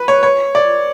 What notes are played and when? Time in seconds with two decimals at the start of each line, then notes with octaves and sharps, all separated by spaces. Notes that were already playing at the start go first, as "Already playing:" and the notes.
Already playing: B4
0.08 C#5
0.23 C#5
0.55 D5